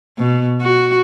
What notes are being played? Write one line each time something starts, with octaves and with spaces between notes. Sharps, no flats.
B2
F#4